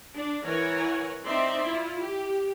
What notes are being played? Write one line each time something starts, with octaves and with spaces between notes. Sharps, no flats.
D4
E3 A#4 C#5 F#5 G#5
C4 D#4 D5 E5 C6
E4 F4
G4